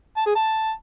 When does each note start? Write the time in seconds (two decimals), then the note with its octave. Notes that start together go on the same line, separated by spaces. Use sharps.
0.17 A5
0.26 G#4
0.35 A5